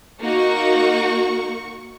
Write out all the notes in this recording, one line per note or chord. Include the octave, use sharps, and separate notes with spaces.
A#3 D#4 F#4 C#6